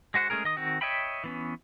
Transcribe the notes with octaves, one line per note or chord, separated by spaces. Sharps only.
G#3 F#4 C5 F#5
G#3 A3 C#4 G#4 A#4
D#3 D#5 D#6
D#3 C4 F#4
C#5 D#5 E5 G5 B5
E3 B3 C#4